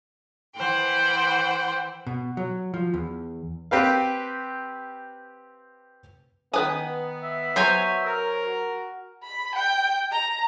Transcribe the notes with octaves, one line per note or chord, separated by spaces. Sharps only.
E3 C5 F#5 G5
B2
F#3
F3
E2
C4 G4 B4 F5
D#3 B3 B4 G#5 D#6
E5
F#3 C5 C#5 G#5
A#4
F#4
B5
G5
A#5